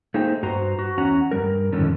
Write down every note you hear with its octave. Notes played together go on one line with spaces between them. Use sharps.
A3 A#3 D#4 G#4 C5 G5
G2 F#4 B4 C5 A#5
F#4
E2 C#4 F#5 A#5
G2 G3 A#4
F2 A2 D3 D#3 A3 C#4